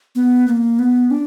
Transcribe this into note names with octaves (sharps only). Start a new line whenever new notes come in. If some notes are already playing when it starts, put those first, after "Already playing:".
B3
A#3
B3
D4